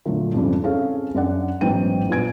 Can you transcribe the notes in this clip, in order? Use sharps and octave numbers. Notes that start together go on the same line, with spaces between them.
A#2 D3 F#3 A3
F2 G#2 C#3 G3 D4
C4 C#4 G#4 A4 F5
F#2 D4 D5 F#5
A1 G#2 F#3 B3 G5 D#7
G2 A#2 B3 G#5 G#6 D7